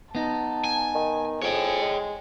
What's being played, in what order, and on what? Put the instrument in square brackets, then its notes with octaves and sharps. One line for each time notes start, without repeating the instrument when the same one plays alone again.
[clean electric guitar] B3 D#4 [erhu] A5
[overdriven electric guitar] G#5
[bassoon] D#3
[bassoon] F2 [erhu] G#4 [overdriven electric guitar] C#5 G5
[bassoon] G#3